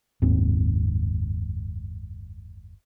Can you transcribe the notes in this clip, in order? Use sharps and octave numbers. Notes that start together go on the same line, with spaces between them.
F#1 D#2 G#2 C4